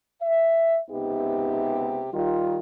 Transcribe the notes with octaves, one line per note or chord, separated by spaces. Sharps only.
E5
C#2 C3 B3 D#4 G4 E5
D#3 G3 F4